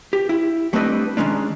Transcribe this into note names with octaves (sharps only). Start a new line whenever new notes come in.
G4
E4
G3 A3 C4 D4 B4 D#5
D#3 E3 G#3 C#4 D4